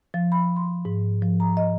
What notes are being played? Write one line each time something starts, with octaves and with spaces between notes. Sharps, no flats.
F3
B5
C6
G#2
F3
A#5
D#5